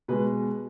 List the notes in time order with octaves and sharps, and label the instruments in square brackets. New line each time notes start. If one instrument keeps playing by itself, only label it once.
[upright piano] B2 G#3 B4